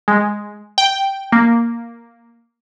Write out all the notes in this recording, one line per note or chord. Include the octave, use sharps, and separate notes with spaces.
G#3
G5
A#3